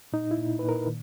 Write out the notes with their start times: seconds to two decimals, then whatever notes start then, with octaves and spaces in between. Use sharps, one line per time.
0.13 A#2 D#4
0.31 E4
0.37 A#2
0.59 A#2 B4
0.69 A#4
0.87 D#3